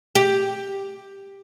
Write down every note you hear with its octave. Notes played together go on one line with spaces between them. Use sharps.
G4